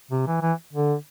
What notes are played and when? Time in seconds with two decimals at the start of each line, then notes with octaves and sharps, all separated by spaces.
0.11 C3
0.27 E3
0.42 E3
0.73 D3